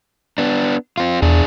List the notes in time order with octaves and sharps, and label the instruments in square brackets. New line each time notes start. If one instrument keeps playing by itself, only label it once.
[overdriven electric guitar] B3 D4
C4 F4
[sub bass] E2 [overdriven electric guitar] D4 G#4